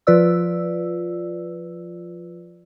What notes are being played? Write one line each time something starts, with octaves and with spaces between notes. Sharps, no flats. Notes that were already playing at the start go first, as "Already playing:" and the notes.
F3 F4 B4 D5 E6